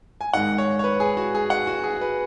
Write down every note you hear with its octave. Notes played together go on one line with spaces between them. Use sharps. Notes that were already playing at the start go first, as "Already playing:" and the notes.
G#5
G#2 D#3 G#3 F#5
C#5
C#5
B4
G#4
F#4
G#4
F#5
F#4
G#4
B4